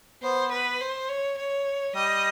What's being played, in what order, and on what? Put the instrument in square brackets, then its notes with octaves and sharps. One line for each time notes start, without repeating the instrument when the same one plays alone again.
[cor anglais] B3 [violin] C5
[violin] B4
C5
C#5
C#5
[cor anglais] G3 [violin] D#5